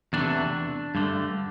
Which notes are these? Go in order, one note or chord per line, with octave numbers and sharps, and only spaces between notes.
E2 C3 E3 A3 D4
G2 D3 A3